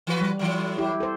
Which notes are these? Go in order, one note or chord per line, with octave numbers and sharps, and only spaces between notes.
E3 F#4 B4
G3
A2 E3 F#3
E4 G4
A4 C5